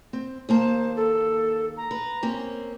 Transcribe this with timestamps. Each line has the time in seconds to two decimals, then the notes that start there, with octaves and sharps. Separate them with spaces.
0.13 C4
0.49 D#2 A#3 C5 A5
0.96 A4
1.77 A#5
1.91 B4
2.23 A#3 C4 C#4